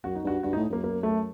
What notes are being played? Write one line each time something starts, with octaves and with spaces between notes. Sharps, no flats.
F#2 F#4
D#4
G2 F#4
G2 F#4
D#4
A2
F#2 A#3
A#3
A3